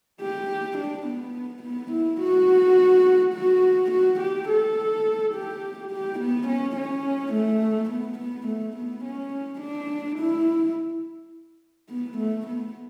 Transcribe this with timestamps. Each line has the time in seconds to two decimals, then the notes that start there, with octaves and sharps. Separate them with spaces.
0.21 G4
0.78 D4
1.07 B3
1.64 B3
1.92 E4
2.21 F#4
3.34 F#4
3.92 F#4
4.20 G4
4.49 A4
5.34 G4
5.91 G4
6.20 B3
6.48 C#4
6.77 C#4
7.34 A3
7.90 B3
8.19 B3
8.48 A3
8.77 B3
9.05 C#4
9.61 D4
10.19 E4
11.90 B3
12.18 A3
12.47 B3